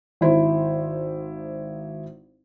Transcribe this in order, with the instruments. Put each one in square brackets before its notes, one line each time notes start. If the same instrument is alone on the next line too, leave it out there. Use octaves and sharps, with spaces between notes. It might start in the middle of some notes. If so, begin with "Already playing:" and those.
[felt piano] G#1 E4 C5